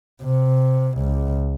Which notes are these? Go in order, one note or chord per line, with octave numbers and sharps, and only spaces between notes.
C3
C#2